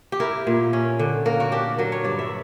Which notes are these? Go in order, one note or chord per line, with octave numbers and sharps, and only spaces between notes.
G4
E4 A#4
A#2
C#4
D3
A#3 A#4
F#4
D4 G4
F#3 A#4
C#5
G2 D5
E5